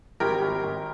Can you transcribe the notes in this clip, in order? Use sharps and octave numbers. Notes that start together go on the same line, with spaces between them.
G#1 G4 A#4
G#1
G#1